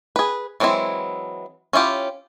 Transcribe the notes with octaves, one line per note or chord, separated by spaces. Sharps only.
G#4 B4
E3 F#3 G#3 C4 E4
C#4 E4 F4 G4